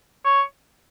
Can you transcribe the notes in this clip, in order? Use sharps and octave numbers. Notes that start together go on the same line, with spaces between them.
C#5